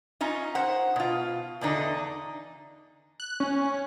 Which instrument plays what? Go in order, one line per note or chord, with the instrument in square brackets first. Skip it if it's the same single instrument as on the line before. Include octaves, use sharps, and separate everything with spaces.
[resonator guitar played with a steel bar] C#4 D#4 F4
C5 F#5
B2 F4
E2 D3 D4 D#4
[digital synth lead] F#6
C#4